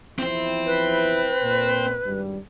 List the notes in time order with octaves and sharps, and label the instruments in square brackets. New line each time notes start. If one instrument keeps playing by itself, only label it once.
[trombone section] E2 F3 E4 [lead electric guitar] C4 C5
[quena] B4
[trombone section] A#2
G#1 G2 G3